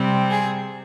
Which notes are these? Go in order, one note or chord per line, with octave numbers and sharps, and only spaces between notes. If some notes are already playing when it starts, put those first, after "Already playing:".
Already playing: C3 G3 C4
G#4